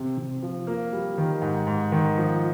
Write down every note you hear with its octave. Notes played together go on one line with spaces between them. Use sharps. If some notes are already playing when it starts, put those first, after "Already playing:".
Already playing: C3
C3
F3
A#3
G3
D#3
G#2
G#2
D#3
F3